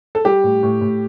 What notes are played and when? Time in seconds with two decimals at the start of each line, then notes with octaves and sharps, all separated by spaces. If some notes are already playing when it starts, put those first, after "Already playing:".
0.15 A4
0.25 G3 G4
0.43 A2
0.63 A2
0.81 A2